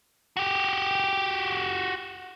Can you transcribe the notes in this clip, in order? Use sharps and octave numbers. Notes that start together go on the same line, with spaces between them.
F#4 G4